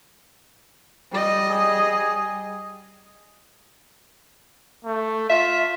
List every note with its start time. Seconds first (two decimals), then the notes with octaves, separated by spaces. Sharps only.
1.12 G3 D#5
1.50 G#4
4.85 A3
5.30 F4 E5